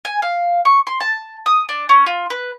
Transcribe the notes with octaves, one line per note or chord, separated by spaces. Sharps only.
G#5
F5
C#6
C6
A5
D#6
D4
C#4
F4
B4